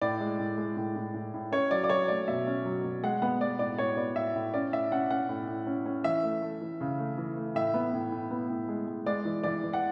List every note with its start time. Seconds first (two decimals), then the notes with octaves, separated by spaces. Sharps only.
0.01 A2 D5
0.20 G#3
0.39 A2
0.58 G#3
0.77 A2
0.96 A2
1.14 A2
1.34 A2
1.52 C#4 C#5
1.71 F#3 D5
1.84 D5
1.90 F#3 C#5
2.08 A3 D5
2.28 B2 E5
2.47 C#4
2.65 F#3
2.84 B2
3.03 G#3 F#5
3.22 B3 F#5
3.41 G#3 D5
3.59 A2 D5
3.78 A2 C#5
3.97 B3 D5
4.16 A2 E5
4.35 A2
4.54 C#4 D5
4.73 A2 E5
4.92 C#4 F#5
5.10 C#4 F#5
5.29 A2
5.48 A2
5.67 C#4
5.86 C#4
6.04 E3 E5
6.23 A3
6.42 A3
6.61 E3
6.81 C#3
6.99 A3
7.18 E3
7.37 A3
7.55 A2 E5
7.74 B3
7.94 A2
8.12 A2
8.31 B3
8.50 A2
8.69 G#3
8.88 G#3
9.06 G#3 D5
9.25 E3
9.43 E3 D5
9.63 E3
9.73 F#5